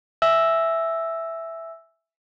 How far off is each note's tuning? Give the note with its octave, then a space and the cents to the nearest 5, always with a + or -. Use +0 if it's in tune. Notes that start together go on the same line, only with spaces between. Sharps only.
E5 +0 G#5 +0 E6 +0